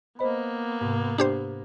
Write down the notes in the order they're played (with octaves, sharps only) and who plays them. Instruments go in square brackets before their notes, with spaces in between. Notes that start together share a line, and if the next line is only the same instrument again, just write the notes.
[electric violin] A#3 B3 [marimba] C5 D#5 B5
[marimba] G#2 C3
[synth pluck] D4 G4 C5